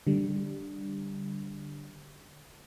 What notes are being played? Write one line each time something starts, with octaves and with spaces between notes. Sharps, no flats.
D3 G3